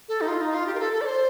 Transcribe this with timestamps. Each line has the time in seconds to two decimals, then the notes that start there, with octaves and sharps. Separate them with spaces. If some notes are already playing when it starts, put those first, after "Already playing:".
0.09 A4
0.21 D#4
0.28 F4
0.41 D#4
0.54 F4
0.67 G4
0.75 A#4
0.80 A4
0.93 A4
1.01 D5
1.06 C5